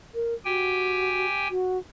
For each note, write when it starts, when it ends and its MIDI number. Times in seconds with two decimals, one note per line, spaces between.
0.14 0.34 70
0.45 1.26 66
0.45 1.48 67
0.45 1.48 79
0.45 1.48 80
1.50 1.78 66